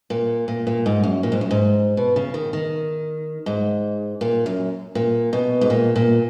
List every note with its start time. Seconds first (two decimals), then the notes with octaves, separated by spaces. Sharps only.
0.10 A#2
0.48 A#2
0.67 A#2
0.86 G#2
1.03 F#2
1.23 A#2
1.32 G#2
1.41 F#2
1.51 G#2
1.97 B2
2.16 C#3
2.34 D#3
2.53 D#3
3.46 G#2
4.21 A#2
4.46 F#2
4.95 A#2
5.33 B2
5.61 G#2
5.70 A#2
5.96 A#2